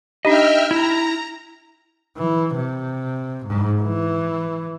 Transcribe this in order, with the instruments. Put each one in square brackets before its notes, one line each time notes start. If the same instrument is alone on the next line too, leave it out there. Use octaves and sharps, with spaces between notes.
[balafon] D4 D#4 G4 [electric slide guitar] D#5 [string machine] E5 G5 F6
[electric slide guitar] E4 [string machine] A#5
[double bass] E3
C3
G#2
E3